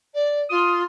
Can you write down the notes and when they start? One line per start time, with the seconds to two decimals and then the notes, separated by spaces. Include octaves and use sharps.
0.14 D5
0.50 F4 D#6